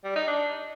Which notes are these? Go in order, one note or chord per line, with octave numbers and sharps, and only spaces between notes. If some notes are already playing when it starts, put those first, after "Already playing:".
G3
D#4
D4